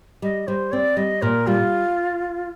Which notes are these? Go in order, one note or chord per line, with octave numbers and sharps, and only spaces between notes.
G3 D#5
G3 C5
C4 D5
G3 D#5
A#2 A#4
G3 F4